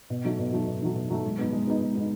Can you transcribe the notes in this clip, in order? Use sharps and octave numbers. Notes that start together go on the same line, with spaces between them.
B2
F#3 A3 D#4
B2
F#3 A3 D#4
B2
F#3 A3 D#4
B2
F#3 A3 D#4
G#3
B3 D#4
G#3
B3 D#4
G#3
B3 D#4